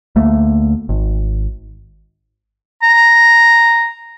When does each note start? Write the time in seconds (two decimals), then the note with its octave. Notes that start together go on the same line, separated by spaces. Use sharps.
0.16 D2 A3 A#3
0.89 G#1
2.83 A#5